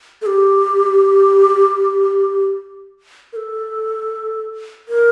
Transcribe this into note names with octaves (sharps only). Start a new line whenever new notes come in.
A4
G4
A#4
A4
A#4